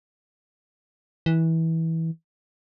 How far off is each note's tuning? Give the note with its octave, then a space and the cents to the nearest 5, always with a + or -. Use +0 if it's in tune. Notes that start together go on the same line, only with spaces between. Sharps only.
E3 -20